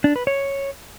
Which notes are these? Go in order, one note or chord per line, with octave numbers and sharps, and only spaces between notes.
D4
B4
C#5